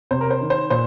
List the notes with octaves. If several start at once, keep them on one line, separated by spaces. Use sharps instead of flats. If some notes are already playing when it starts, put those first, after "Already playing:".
C3 C5
A#4
C5
D#3
C5
A#2 C5